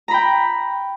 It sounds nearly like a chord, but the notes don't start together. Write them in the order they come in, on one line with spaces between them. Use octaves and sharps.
A#5 B5 G5